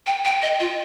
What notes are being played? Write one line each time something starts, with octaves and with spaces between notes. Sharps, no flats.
G5
G5
D#5
F4